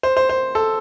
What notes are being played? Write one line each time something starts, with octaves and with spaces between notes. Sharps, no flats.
C5
C5
C5
A4